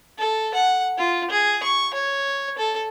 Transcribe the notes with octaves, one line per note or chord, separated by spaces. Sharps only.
A4
F#5
F4
G#4
C#6
C#5
A4